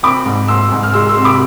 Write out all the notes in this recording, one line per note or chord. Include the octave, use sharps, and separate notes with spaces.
C4 B5 D6
G#2
G#2 C6 E6
G#2
F6
G#3 C6 E6
C6 E6
C3
B5 D6